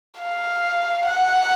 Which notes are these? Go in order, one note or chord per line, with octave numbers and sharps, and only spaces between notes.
F5
F#5